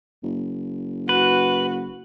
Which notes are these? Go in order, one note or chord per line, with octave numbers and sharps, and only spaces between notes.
F#1
F#4 B4